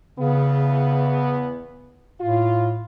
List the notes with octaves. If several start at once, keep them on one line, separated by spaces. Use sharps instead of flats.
E2 C#3 B3
A2 F4